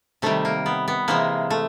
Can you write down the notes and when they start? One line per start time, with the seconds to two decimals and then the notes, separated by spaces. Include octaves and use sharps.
0.22 C3 D#3 G3 A3
0.45 A#3
0.66 B3
0.88 B3
1.08 C3 E3 G#3 A#3
1.50 A3